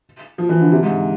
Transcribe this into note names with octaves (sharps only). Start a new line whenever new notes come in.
F3
E3
D3
C3
G#2